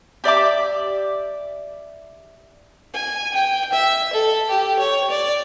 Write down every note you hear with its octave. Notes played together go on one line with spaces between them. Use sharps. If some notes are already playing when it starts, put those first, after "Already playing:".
G4 D5 E5 D6
G#5
G5
E5
A4
G4
C#5
D5